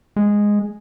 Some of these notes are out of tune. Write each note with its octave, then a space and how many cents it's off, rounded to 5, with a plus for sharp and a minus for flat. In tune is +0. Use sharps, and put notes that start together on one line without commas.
G#3 -5